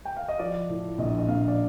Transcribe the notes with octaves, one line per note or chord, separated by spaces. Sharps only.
G5
F5
D#5
F3 D5
A2
A#1 D#5
D#5
A#1 F5
D5